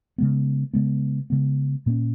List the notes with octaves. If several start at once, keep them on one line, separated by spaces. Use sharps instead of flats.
C#3 G#3 B3
C#3 G#3 B3
C#3 G#3 B3
A#2 A#3 C#4